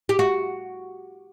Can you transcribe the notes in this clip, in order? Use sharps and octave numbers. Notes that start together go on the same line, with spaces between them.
G4
F#4